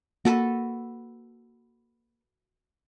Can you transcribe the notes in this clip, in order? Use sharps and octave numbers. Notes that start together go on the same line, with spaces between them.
A#3 F#4 A4 B4